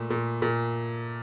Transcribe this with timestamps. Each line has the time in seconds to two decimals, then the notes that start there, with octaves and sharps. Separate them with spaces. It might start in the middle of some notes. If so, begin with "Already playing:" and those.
Already playing: A#2 A3
0.10 A#2
0.42 A#2